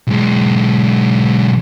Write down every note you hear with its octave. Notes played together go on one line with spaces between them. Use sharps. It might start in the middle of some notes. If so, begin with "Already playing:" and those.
B1 G#3